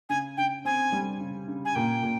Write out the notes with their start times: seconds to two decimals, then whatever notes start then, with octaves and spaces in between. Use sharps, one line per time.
0.10 C#3 G#5
0.37 C#3 G5
0.65 C4 G#5
0.92 G3
1.20 C#3
1.48 C#3
1.65 G#5
1.75 A#2 G5
2.03 A#2